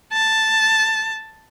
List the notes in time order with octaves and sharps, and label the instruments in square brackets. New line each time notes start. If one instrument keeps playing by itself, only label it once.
[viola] A5